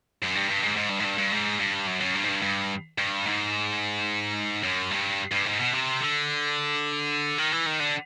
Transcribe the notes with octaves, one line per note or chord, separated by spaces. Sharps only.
F#2
G2
G2
G#2
G#2
G2
G#2
G2
G2
G#2
G2
F#2
F#2
G2
G#2
G2
G2
G2
G#2
F#2
G2
G2
G#2
B2
C3
D3
D#3
E3
D#3
D3